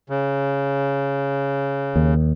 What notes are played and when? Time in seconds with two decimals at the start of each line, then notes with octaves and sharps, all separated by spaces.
0.10 C#3
1.96 D#2